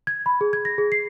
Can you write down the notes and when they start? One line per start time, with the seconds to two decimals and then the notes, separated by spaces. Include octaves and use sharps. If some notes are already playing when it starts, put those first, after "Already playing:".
0.07 G#6
0.26 B5
0.41 G#4
0.53 G#6
0.65 A#6
0.78 G#4
0.92 C7